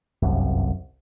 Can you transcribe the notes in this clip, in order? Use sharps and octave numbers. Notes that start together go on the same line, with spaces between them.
G1 C2 F#2